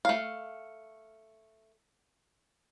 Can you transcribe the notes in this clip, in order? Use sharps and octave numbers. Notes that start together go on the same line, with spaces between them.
A3 F5